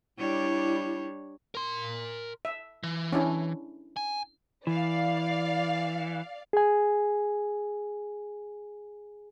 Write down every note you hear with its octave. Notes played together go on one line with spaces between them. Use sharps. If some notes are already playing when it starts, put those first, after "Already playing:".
G3 D4 E4 C#5
A#4 C6
E5
E3
C#4 D4 E4
G#5
E3 D5 F5
G#4 G#5